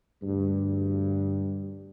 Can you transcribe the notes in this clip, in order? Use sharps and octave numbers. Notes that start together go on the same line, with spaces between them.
D2 G2